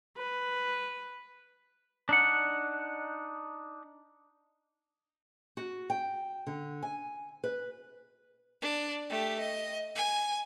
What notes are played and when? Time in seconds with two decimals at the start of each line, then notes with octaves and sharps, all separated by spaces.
0.17 B4
2.09 D4 D#4 F#5
5.57 F#4
5.90 G5
6.47 D3
6.83 G#5
7.44 B4
8.62 D4
9.10 A3 G4
9.39 D#5
9.95 G#5